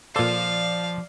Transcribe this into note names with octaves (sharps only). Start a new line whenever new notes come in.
A#2 F3 A4 C5 D5 F5